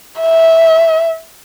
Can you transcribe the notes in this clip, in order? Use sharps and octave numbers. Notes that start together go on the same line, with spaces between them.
E5